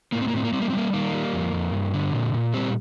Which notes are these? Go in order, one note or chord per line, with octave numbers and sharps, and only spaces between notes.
A2 A#3
C4
A#3
A2 C4
A#3
G3 C4
A#3
C4
G3 A#3
D#3 A#3
G3
F2
F2
G2
D3
A#2
A#2
G3 C4